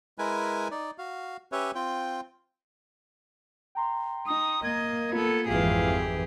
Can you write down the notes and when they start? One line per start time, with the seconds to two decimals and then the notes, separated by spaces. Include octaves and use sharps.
0.18 G#3 E4 A#4 B4 G#5
0.71 D#4 D5
0.98 F#4 F5
1.52 C#4 G4 B4 C#5 E5
1.75 C4 F4 G5
3.75 G5 A#5 C6
4.27 D#4 D#6
4.64 A#3 D#5 G#6
5.12 B3 F4 A4
5.48 G#1 F2 E3 G4 G#4 F5